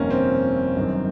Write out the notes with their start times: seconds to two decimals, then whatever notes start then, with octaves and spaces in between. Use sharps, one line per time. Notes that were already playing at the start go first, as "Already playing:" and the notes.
Already playing: G1 F2 C3 D#3 A#3 C#4
0.10 C4
0.76 G1 F#2 D#3